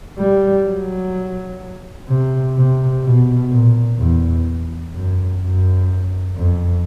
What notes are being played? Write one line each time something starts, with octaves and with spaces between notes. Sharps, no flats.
G3
F#3
C3
C3
B2
A#2
E2
F#2
F#2
F2